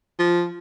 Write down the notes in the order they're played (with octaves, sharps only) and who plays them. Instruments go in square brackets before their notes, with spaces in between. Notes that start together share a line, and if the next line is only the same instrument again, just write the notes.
[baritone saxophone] F3